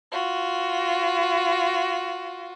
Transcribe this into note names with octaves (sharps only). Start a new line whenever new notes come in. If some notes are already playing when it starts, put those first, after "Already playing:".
F4 F#4